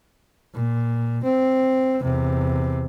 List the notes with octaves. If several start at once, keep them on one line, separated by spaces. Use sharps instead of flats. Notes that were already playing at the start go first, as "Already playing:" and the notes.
A#2
C4
E2 C3